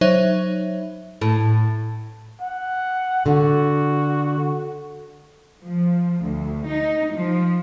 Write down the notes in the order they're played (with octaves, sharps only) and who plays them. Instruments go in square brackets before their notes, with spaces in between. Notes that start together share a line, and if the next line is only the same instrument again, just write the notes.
[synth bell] F#3 D#4 C5 C#5 E5
[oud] A2
[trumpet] F#5
[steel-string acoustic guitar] D3 [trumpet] F#4
[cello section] F3
D2
D#4
F3